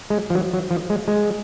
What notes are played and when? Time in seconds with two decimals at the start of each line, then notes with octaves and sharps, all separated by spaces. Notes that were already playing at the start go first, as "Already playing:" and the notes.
0.10 G#3
0.30 F3
0.35 F#3
0.53 F#3
0.71 F3
0.90 G#3
1.08 G#3